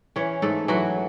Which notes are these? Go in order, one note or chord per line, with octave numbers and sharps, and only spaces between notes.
E3 C#4 C#5
G#2 A3 A4
E3 F#3 F#4